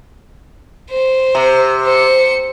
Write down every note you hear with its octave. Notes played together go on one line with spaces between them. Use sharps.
C5
C3
C5 C#7